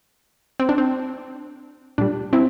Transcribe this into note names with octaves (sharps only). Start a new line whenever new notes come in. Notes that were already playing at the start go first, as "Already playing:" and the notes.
C4
D4
C4
A#2 G3 D4
C4 E4